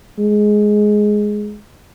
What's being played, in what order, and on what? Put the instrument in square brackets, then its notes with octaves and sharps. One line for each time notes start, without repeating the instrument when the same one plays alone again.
[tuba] G#3